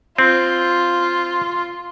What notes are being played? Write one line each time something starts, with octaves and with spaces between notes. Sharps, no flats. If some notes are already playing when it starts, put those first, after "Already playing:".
C4 F4